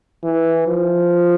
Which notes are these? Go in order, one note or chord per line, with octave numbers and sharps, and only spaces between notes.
E3
F3